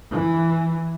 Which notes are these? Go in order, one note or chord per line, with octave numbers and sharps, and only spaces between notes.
E3